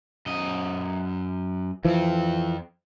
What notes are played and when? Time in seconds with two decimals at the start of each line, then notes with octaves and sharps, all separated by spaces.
0.26 F#2 D#5
1.85 F2 E3 F3 C4